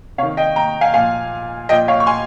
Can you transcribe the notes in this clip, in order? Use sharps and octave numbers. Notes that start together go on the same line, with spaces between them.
C3 D#3 C#5 F5
D#5 G5
G5 A#5
F5 G#5
A#2 F3 F5 G#5
A#2 F3 D#5 G5
C#5 F5
C#6
G#5 C6